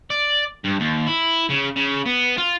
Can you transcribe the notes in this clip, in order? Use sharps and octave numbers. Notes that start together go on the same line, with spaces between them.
D5
G2
D#2
E4
C#3
C#3
B3
F4